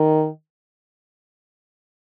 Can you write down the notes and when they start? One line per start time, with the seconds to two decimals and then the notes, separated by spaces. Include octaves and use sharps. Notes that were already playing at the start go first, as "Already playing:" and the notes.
Already playing: D#3